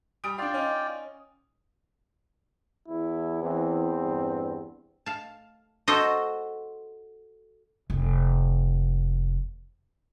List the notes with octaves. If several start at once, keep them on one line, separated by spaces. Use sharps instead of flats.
G3 D#6 D7
D4 F4 D5 F5 G5
C#4 D#4
E2 E4
E3 C4
G2
F5 A5
F#4 A4 C5 D#5
F1 D#3